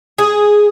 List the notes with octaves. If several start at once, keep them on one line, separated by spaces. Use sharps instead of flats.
G#4